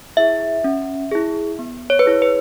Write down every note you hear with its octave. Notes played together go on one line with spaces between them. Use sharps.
E4 G#4 E5
C#4
E4 G#4
B3
C#5
B4
E4 G#4 C#5
B4